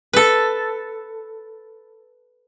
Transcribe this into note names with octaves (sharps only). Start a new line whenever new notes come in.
A4 B4